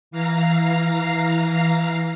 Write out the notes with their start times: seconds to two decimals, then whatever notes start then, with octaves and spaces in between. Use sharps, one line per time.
0.11 E3 F5 A#5 C7